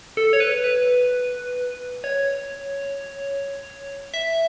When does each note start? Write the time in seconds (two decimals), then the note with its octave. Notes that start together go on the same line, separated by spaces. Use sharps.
0.17 A4
0.33 C#5
0.40 B4
0.64 B4
2.04 C#5
4.14 E5